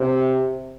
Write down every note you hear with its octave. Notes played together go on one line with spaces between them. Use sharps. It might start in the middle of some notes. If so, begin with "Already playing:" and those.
Already playing: C3